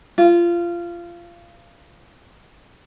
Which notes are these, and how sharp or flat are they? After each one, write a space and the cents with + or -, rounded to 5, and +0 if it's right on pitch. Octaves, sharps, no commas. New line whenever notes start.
F4 -20